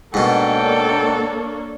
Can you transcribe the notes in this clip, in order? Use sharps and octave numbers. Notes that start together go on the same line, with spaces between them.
G#2 B2 A#3 D4 A4 C#5 G5